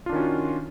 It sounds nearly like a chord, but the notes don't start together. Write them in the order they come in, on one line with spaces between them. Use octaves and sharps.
F4 D4 D#3 C#4 F#4